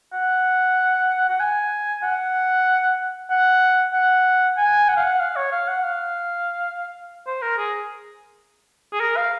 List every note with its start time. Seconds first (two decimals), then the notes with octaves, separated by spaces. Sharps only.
0.13 F#5
1.29 F#5
1.40 G#5
2.03 F#5
3.30 F#5
3.93 F#5
4.57 G#5
4.89 F#5
4.96 F5
5.04 F#5
5.20 F5
5.36 C#5
5.52 F5
5.68 F#5
5.84 F5
7.27 C5
7.42 A#4
7.58 G#4
8.92 G#4
9.00 A#4
9.17 F5